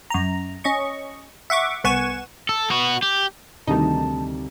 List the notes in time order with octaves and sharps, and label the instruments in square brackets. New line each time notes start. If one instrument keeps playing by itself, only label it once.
[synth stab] F#2 A#5
C#4 D#5 C#6
E5 F#5 C#6 D6
C2 B3 F#5 G#5 C#6 E7
[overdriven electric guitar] A4
B3 F#4
G4
[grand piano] D2 C3 G3 [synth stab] D#3 D#4 [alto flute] A5